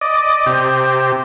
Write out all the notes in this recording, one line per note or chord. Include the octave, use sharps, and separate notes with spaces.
D5 D#5
C3 G4